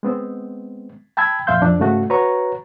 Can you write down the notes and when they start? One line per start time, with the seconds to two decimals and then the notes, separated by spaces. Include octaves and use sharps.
0.03 G#3 B3 C4
1.17 G5 A5 B5 E6 G#6
1.47 F2 A#2 E5 F5 C6 G6
1.61 F2 C4 D4
1.80 G#2 C#3 A3 F#4
2.10 F#4 B4 C#5 A#5 C#6